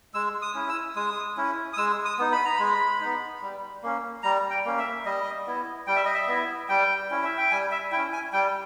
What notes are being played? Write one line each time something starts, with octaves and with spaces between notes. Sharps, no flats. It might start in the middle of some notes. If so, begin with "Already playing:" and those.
G#3 E6
D#6
C#4 E4
E6
G#3 D#6
C#4 E4
D#6
G#3 E6
D#6
B3 D#4
B5
A#5
G#3 B5
B3 D#4
G3
A#3 C#4
G3 A#5
G5
A#3 C#4
E5
G3 D#5
B3 E4
G3 G5
E5
D#5
E5
B3 E4
G3 G5
C#4 E4
E5
G5
G3 G#5
E5
C#4 E4 G5
G#5
G3 G5